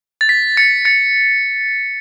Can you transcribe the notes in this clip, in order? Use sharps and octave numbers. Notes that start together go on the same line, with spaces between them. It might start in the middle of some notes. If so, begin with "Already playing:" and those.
A6
B6
A6 C#7
A6 C#7